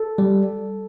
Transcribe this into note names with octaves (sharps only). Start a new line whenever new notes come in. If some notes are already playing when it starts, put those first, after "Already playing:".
Already playing: A4
G3